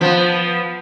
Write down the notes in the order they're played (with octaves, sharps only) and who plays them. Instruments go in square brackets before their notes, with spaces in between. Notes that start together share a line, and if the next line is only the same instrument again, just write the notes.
[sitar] F3 B3